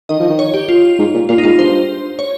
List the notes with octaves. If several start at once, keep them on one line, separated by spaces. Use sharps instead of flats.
D#3 D#5
F3
D#3
C#5
G4
F4
G#2
A#2
A#2 F4
D#4
G#2 F4
G2 C5
C#5